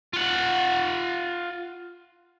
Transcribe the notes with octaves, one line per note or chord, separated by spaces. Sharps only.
F4 F#5